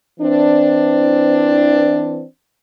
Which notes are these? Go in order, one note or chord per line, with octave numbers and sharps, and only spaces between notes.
E3 C4 D4